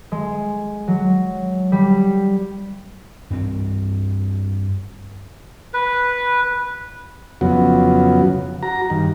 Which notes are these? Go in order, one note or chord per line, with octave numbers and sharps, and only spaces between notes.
G#3
F#3
G3
G2 C4
B4
F2 C#3 F#3 B3 F#4
F#4 A#5
G2 D#3